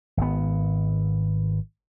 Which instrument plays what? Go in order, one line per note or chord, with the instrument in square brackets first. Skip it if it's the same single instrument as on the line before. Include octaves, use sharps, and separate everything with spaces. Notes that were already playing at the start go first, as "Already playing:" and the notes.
[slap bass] G#1 B3